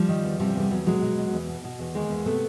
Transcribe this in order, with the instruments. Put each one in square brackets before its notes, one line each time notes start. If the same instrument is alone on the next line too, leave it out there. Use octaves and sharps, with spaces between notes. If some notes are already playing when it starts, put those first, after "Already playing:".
Already playing: [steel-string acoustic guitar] F3 G3
D#3
E2
C3 F3 G3
E2 G3
E2 F#3
B2 F#3 G#3
B2
E2
E2
B2
B2
E2
D#3 G#3 A#3
E2
C3 A3 B3